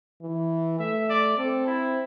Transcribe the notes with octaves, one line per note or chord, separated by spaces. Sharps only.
E3
A3 E5
D5
C4 A4
E4